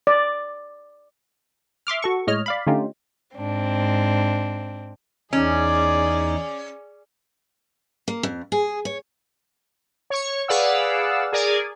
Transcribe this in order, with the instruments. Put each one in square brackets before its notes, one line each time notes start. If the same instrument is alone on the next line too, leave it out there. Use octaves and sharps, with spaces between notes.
[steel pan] D5
[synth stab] E5 C6 D6 F6
F#4 A4 C#6
A2 G#3 C#5 D#5 F6
D5 F5 B5
D3 A3 C#4 D#4 F4 G4
[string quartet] G#2 C4 D4
[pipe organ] E2 D#4 [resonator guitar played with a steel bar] C#4 [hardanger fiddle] G#4 D5
[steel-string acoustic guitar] A#3
F2
G#4
C#5
[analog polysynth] C#5 C#6
G#4 B4 D5 F5 F#5 E6
G#4 A#4 D5 G#5